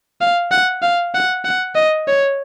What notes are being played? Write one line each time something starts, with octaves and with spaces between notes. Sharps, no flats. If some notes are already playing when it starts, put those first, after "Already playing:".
F5
F#5
F5
F#5
F#5
D#5
C#5